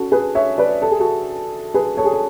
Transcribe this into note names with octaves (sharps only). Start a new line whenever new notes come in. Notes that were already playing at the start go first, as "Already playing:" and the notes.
Already playing: C#4 F#4 A4
G#4 B4
C#5 E5
B4 D5
A4
G#4
F#4 A4
G#4 B4
A4 C#5
G#4
A4